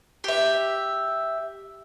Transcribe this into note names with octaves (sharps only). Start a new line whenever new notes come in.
G4 E5